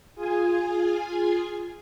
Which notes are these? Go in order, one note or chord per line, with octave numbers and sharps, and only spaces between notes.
F4 G#4 G#5